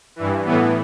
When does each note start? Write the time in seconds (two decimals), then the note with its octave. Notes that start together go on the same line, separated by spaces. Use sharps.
0.16 G2 E3
0.45 A2 E3 B3